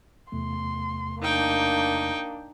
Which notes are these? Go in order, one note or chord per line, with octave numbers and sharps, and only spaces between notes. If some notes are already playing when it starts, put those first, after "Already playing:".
E2 C3 A3 C6
A#3 D4 D#4 G5